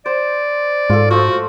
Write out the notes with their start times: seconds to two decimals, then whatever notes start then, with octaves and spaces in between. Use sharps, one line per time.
0.06 C5 D5
0.90 G#2 F4 A4
1.10 F3 A3 F#4